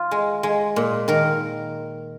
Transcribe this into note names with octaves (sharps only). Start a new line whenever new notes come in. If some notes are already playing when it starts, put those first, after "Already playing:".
Already playing: F4
G#3
G#3
A#2
D#3 A#4